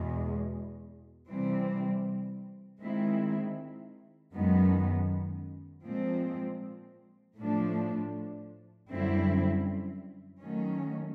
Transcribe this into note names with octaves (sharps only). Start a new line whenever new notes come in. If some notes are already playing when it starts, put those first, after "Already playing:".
Already playing: E2 B2 G#3
C3 E3 G3 C4
D#3 G#3 C4 E4
F#2 D#3 G#3 B3
A#2 F3 G#3 C4
A2 F3 A3 D4
F#2 D3 G3 C4 E4
D#3 F#3 A3 C#4